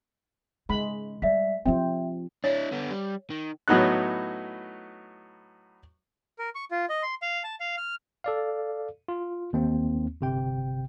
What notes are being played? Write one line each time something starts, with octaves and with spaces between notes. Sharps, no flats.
C#3 G#3 B5
G3 D5 E5 B6
F3 C4 F4 E5 G5
D4 E4 C#5
D3 B3
G3
D#3
A2 F#3 B3 D#4 F#4 F#6
A#4
C#6
F4
D#5
C6
F5
A5
F5
F6
A4 D5 F5
F4
D#2 A#3 C4
G1 C3 G5